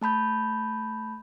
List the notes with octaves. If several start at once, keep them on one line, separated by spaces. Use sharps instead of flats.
A3 A5 B5 G6